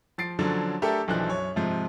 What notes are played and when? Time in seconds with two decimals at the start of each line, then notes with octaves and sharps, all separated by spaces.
0.18 F3 A6 C7 D7
0.39 D3 F3 F#3 C#4 D4
0.82 A3 D4 G4 A4 A#4 E5
1.08 B1 E3 F3 D4 A4 F#6
1.28 F#2 C#5
1.56 G#2 C3 F3